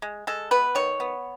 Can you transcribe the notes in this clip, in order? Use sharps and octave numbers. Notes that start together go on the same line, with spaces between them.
G#3
G#3 A4
B3 B4
D#3 C#5
B3